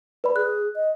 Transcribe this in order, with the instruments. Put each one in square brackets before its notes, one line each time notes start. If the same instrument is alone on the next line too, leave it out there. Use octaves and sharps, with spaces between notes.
[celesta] B4 D5 B5
[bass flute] G#4 [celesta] F#6
[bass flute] D#5